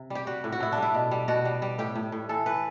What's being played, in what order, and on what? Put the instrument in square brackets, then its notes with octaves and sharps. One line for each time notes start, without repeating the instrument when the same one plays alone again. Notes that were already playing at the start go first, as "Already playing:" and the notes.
Already playing: [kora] C3
G3 G4
G3 F#4
A2
F#4
A2 E4
D4
G3 E4
B2
G3
B2 F#4
G3
G3
A2 G4
A2
A2
E3 A4
E3 B4